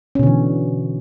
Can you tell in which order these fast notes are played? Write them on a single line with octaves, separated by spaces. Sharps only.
C#4 B2 D3 E3